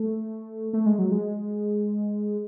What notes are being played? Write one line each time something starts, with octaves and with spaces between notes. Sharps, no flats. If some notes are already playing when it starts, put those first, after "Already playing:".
Already playing: A3
A3
G#3
F#3
G#3